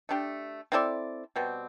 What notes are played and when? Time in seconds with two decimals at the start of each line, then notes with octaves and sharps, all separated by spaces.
0.09 A3 D4 G4
0.72 C4 E4 A4 D5
1.36 B2 G3 C4